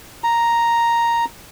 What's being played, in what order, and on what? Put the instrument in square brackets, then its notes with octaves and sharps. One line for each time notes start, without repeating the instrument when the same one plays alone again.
[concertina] A#5